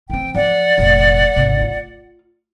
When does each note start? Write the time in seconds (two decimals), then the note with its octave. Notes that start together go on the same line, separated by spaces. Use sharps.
0.10 E3 C4 G5
0.35 F3 D5 F#5
0.78 F1 A#1
1.36 G#1 C3
1.61 F4